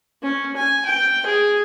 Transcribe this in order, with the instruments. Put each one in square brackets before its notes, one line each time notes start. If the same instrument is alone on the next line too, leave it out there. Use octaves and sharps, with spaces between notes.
[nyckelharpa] C#4
G#5
G5
G#4